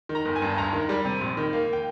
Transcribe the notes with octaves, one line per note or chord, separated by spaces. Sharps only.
D#3
A#5
G1
G#5
G2
D2 A#5
D#3
G3
C3
A#1
D#3
A#3
G5